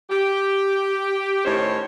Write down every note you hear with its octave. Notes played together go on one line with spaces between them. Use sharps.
G4
A2 D#3 C#4 C5 C#5